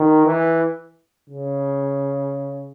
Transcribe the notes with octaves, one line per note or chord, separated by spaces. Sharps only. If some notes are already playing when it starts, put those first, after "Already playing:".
Already playing: D#3
E3
C#3